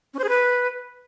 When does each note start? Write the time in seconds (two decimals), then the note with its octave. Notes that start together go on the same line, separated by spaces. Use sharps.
0.14 C#4
0.19 C5
0.24 G#4
0.29 B4